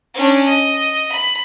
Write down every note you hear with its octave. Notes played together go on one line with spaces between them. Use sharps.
C#4 D4
D#5
B5